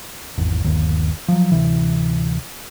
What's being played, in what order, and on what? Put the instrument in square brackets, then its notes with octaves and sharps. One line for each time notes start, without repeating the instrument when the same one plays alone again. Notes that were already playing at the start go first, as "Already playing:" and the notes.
[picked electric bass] G#1 E2
G1 D#2
F3 F#3
D1 C3 E3